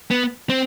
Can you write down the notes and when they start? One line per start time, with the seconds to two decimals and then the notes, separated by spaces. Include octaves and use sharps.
0.11 B3
0.49 C4